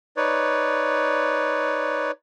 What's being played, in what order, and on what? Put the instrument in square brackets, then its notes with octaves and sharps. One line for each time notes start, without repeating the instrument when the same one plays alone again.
[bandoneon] D#4 B4 C#5 D5